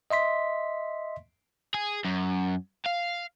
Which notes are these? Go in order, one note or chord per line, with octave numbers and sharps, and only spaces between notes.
D#5 E5 C6 B6
G#4
F#2
F5